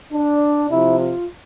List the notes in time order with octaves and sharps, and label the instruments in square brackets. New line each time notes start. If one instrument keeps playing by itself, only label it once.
[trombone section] D4
C3 F3 E4
F4